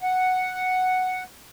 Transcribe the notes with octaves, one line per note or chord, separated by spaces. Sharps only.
F#5